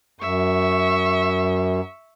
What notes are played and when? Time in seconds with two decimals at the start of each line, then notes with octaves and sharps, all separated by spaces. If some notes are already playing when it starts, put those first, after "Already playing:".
0.20 F#2 E5 C#6